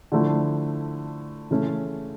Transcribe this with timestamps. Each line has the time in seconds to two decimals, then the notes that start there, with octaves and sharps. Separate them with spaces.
0.12 D3 F3 A3 E4
1.51 C#3 E3 A3 C#4